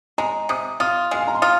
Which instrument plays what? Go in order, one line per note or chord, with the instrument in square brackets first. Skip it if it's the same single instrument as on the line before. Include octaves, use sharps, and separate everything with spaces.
[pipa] G#3 [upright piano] A#5
[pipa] C3 [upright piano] D#6
[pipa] F4 [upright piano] D#6
[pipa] G#3 [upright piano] F5
[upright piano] G#5
A#5
C6
[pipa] F4 [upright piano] D#6